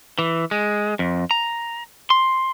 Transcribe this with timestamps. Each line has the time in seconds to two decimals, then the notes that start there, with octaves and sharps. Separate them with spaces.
0.19 E3
0.51 G#3
0.99 F2
1.31 A#5
2.10 C6